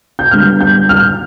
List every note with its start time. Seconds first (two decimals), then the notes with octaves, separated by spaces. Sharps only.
0.19 G6
0.31 D3 G3 B3 F6
0.61 G6
0.89 F6